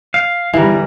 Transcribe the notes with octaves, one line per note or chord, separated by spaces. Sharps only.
F5
E2 D3 E3 G3 A#4